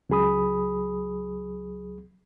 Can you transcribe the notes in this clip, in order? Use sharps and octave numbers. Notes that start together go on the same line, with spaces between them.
C#2 F#3 G#4 B5 D#6